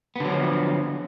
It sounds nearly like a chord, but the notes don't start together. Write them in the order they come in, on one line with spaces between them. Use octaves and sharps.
B3 D3 F#3 F3